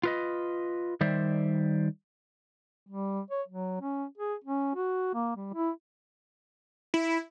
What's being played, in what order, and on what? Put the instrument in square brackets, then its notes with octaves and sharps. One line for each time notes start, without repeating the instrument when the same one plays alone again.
[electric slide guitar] F4 B4 D#5
D#3 G3 C5 D5 E5
[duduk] G3
C#5
F#3
C#4
G#4
C#4
F#4
A#3
G3
E4
[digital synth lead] E4